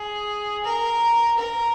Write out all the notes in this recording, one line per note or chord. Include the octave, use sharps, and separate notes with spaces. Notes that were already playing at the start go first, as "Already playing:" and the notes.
Already playing: G#4
A#4
A#4